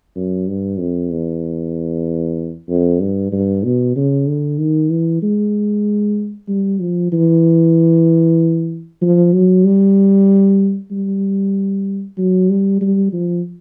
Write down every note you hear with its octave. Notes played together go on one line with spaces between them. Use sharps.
F#2
G2
F2
E2
F2
G2
G2
B2
C#3
D3
D#3
E3
G#3
G3
F3
E3
F3
F#3
G3
G3
F#3
G3
G3
F3